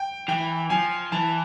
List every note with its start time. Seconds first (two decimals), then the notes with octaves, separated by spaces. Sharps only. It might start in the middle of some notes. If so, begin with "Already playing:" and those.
Already playing: G5
0.28 E3 G5
0.70 F3 G#5
1.12 E3 A5